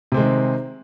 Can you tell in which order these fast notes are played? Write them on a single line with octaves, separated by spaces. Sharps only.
C3 C4 G#3 D#3